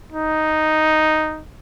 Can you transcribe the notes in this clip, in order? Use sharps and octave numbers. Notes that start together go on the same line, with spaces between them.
D#4